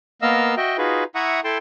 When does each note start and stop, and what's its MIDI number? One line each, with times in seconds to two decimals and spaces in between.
0.22 0.55 58
0.22 0.55 59
0.22 0.55 70
0.22 0.55 75
0.22 0.55 77
0.22 0.55 88
0.57 0.77 66
0.57 0.77 75
0.57 0.77 76
0.57 0.77 79
0.78 1.04 63
0.78 1.04 65
0.78 1.04 66
0.78 1.04 68
0.78 1.04 71
1.15 1.40 64
1.15 1.40 76
1.15 1.40 78
1.15 1.40 82
1.15 1.40 85
1.15 1.40 87
1.44 1.58 64
1.44 1.58 69
1.44 1.58 79
1.44 1.58 81
1.44 1.58 84